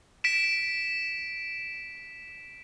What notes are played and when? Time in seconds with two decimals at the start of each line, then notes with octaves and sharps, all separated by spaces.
0.24 B6 D7 E7